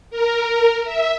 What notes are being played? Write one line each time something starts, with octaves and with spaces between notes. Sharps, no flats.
A#4
E5